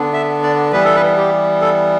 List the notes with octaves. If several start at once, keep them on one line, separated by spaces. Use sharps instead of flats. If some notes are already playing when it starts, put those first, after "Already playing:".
Already playing: D3 B3 D4
E5
D5
E3 G3 B3 B4
A4
B4
G4
A4